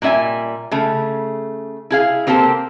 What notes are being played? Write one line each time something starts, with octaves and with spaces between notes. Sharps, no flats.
A#2 G3 E4 E5 G#5
C#3 A3
E4 G#4 F5
A#3 C4 G4 A4 C5